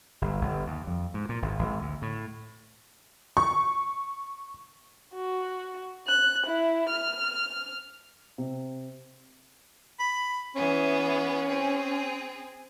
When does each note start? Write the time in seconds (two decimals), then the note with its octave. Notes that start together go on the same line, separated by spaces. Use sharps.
0.22 G1
0.41 G1
0.67 D#2
0.87 F2
1.14 G#2
1.29 A#2
1.42 G#1
1.59 G#1
1.82 D2
2.02 A2
3.37 C#6
5.14 F#4
6.07 F#6
6.47 E4
6.89 F6
8.38 C3
10.00 B5
10.55 E3 B3 C#4 G#4
11.48 C4 G#4